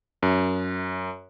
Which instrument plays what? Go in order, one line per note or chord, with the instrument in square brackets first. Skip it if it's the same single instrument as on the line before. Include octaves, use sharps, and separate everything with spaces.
[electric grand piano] F#2